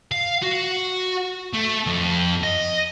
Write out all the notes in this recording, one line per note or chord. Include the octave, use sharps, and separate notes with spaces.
F5
F#4
A3
F2
D#5